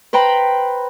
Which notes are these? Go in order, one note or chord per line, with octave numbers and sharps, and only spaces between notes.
B4 C5 G5 A#5 B5